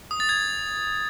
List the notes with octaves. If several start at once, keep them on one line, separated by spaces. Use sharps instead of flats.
D#6
A6
G#6